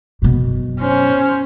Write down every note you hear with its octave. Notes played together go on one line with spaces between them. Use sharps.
F#2 B2
C#4 C5